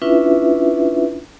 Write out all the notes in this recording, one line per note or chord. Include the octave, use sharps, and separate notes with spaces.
C#4 D4 E4 F4 B4 E5